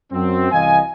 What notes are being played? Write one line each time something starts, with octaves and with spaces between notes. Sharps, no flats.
F#2 C4
C2 E3 D#5 F5 G#5